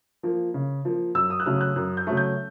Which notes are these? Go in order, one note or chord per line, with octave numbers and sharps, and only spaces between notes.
F3 A#3
C#3
F3 A#3
F#2 E6
D#6
F#6
C#3 F#3 A3 F6
F#6
F#2 F#6
G6
C#3 F#3 A3
G6